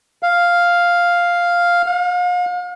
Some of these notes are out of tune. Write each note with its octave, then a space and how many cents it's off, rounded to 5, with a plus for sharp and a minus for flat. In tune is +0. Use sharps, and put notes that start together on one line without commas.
F5 +0
F5 +40